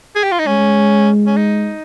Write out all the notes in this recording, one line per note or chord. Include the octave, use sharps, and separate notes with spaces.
G#4
G4
F4
D#4
G#3 C#4
C#4
D#4